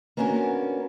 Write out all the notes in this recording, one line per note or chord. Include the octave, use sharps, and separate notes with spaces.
A#3 B3 C#4 D4 F#4 A#4